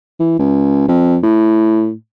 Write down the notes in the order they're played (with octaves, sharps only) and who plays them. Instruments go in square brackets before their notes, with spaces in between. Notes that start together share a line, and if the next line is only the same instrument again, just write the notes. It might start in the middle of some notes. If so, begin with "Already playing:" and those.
[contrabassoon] E3
C#2
F2
A2